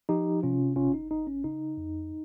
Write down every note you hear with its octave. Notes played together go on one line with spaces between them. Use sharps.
F3 D#4 G4
C3 C#4 F4
G1 C#4 F4
D#4
G1 D#4
C#4
C#3 D#4
F2